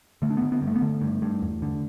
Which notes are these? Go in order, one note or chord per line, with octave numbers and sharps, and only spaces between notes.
D3 A3
D4
D3 B3
B3
G2
A3
B3
D3 A3
G2
G2
E2
D3